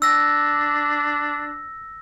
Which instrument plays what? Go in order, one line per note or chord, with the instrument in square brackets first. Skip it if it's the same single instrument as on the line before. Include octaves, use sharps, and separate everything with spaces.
[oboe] D4 [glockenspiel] E6 A#6